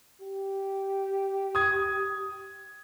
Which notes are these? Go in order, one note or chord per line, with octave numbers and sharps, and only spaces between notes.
G4
D#6 G#6